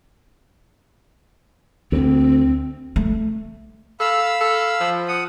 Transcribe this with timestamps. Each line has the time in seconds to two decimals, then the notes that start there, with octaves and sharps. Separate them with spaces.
1.92 D2 C4
2.96 A3
4.00 A4 F5 B5 E6
4.41 A4
4.81 F3
5.08 F#5 D#6